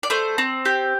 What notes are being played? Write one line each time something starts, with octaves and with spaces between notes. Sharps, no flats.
D5
A3 C5
C4
G4